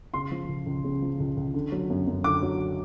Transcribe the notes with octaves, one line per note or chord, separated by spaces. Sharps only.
C#3 C6
F3
C#2
C#2
C#3
F3
C#2
C#2
D3
F#3
F#2
F#2
D3 D6
F#3